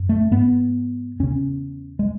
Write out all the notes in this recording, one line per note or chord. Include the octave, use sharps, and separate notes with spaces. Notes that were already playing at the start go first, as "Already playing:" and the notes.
Already playing: F#2
A3
G#2 B3
E2 C#3 C#4
G#3